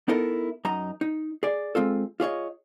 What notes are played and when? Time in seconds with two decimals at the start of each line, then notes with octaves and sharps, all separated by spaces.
0.08 B3 D#4 E4 A4 A#4
0.65 F#2 D#4 A#5
1.01 D#4
1.43 G#4 D5
1.75 G#3 C4 F4 A4
2.20 F4 G#4 C#5 D#5